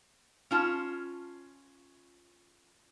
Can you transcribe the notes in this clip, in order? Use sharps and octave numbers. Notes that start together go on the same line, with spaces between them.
C#4 F4 A5